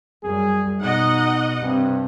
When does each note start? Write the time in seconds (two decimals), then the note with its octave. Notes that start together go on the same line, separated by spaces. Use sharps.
0.24 F#2 G3 G#4
0.81 B2 D#4 D#5 F#5
1.62 G2 C3